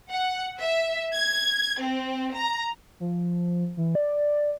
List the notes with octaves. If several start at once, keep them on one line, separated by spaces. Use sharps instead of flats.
F#5
E5
G#6
C4
A#5
F3
E3
D5